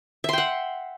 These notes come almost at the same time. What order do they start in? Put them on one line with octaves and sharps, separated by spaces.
E5 C6 G5 F#5